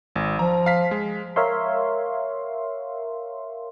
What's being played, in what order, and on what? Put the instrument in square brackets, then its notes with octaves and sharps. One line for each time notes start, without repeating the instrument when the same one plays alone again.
[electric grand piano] G#1
[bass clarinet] F3 [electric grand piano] A#5
[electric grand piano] F5 B6
G#3
[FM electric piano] A#4 C#5 E5 F5 C6